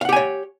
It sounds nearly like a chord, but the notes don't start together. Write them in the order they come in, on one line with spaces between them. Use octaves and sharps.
F5 F#5 G4 G#5 C#5